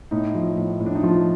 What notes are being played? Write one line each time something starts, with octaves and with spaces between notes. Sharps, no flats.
A2 D#4
F3
A2
A2
D4
D#4
F3 F4